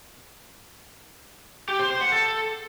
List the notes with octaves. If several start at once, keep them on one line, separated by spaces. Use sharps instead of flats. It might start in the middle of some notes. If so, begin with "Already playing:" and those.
G4
C5
C5
F#5
A4